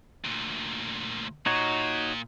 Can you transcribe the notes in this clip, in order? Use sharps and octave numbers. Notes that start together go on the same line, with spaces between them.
D2 A#2
A#2 D#4 F#4 C#5